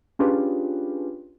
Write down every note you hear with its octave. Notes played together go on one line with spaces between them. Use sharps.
C#4 D4 F4 G4 G#4 B4